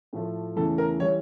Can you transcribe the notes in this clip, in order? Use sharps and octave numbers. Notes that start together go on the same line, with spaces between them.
A2 F3 A3
E2 C#3 E3 A3 A4
A#4
E3 G3 C#5